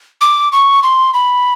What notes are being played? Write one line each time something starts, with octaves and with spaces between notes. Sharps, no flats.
D6
C#6
C6
B5